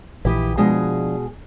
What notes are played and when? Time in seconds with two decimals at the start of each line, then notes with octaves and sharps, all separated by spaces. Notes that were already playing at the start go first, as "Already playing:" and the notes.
0.25 A#1 A#2 E3 E4 G4 D#5
0.57 B2 F3 G#3 D4 G#4